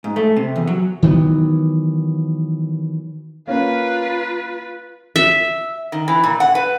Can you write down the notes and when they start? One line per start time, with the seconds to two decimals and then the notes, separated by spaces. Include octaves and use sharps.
0.04 G#2
0.16 A3
0.36 C3
0.56 E2
0.67 F#3
1.03 D#3 E3 F#3 B3
3.47 A#3 C#4 F4 B4
5.16 E5
5.92 D#3
6.08 E3
6.24 A#2
6.40 F#5
6.55 B4